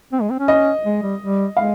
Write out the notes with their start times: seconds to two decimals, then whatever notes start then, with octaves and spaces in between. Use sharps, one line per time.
0.13 C4
0.22 G#3
0.30 C4
0.39 C#4
0.48 D#5
0.85 G#3
1.03 G3
1.21 G3
1.56 G#3 F5